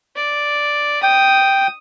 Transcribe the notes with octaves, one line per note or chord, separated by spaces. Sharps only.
D5
G5 D#6